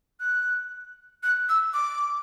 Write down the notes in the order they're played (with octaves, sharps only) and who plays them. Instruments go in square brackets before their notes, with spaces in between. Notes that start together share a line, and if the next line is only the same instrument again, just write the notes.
[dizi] F#6
F#6
E6
D6